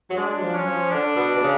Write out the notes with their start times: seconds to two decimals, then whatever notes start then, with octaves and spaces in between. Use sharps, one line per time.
0.10 F#3
0.16 G#3 D4
0.37 F#3
0.42 F3
0.54 C#4
0.60 F#3
0.67 F3
0.91 D3 D4
1.16 B2
1.35 B2
1.42 C#3